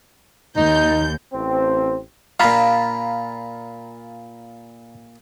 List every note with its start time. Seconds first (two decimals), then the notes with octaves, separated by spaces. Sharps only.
0.57 D#2 D#4 G6
1.33 A1 C4
2.40 A#2 F4 F5 A#5 B5